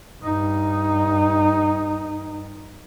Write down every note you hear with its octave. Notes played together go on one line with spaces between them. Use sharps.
G2 D#4